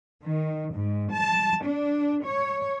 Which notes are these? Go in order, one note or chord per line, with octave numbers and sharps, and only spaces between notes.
D#3
G#2
A5
D4
C#5